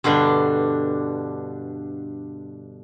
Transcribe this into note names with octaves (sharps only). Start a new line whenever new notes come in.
G2 B2 D3 D4